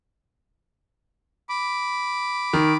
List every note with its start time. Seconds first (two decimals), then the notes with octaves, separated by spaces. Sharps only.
1.49 B5 D6
2.53 D#3